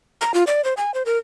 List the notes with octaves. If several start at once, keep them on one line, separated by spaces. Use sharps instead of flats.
A#5
F4
D5
C5
G#5
C5
A#4